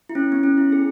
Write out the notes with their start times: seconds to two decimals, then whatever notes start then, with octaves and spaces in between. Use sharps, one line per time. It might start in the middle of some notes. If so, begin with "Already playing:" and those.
0.09 E4
0.15 C#4
0.32 B3
0.43 C#4
0.58 E4
0.72 G#4